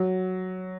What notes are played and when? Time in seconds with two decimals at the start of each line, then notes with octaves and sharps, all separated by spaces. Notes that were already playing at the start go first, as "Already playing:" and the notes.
Already playing: F#3